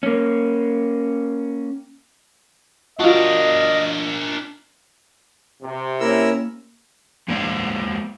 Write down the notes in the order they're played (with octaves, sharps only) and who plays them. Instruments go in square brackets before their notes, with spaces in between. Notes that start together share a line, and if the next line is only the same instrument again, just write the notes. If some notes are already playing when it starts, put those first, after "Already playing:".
[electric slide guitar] A#3 C#4
[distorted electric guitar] D4 A#4 [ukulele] F4 F#4 [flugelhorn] D#5
[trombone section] C3
[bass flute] A#3 [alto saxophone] C#4 [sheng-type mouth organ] E4 A#4 E6
[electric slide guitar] G#3 A#3 C5 D5 F5